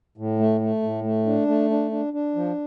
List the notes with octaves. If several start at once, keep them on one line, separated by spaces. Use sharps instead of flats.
A2
A3
A3
A2
A3
D4
A3
D4
D4
D4
F3